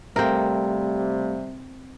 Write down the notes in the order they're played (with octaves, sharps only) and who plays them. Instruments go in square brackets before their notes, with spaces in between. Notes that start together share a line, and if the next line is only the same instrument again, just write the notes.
[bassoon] C3 [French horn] G3 [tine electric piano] A3 F5 [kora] C4 A#4